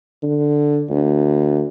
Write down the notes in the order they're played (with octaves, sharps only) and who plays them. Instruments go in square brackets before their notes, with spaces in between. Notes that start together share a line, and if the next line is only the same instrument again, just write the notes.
[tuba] D3
D2